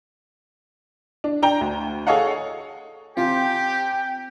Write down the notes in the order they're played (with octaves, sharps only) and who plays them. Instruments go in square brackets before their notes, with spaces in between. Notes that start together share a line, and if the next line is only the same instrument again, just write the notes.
[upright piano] D4
D4 G5 A#5 G7
D2
G#4 A4 C#5 D#5 F5 F#5
[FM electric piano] C4 G#5 A#5 [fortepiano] F4 [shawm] G4 [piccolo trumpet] G5